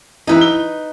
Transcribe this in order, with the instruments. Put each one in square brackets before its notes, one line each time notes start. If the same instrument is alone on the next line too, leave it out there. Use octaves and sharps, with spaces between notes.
[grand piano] E3 E4 [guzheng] D#4 B4
[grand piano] G7